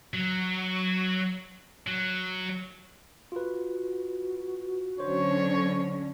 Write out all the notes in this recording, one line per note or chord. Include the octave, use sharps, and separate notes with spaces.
F#3
F#3
F4 F#4 B4
D3 F#3 C#4 C5 C#5